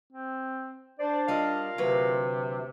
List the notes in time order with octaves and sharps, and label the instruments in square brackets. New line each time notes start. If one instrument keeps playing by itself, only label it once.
[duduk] C4
[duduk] D4 [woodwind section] C5 D5
[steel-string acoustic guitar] G3 D#5 [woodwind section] F4 A#4 F5
[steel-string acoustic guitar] D2 F#3 B4 [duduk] C3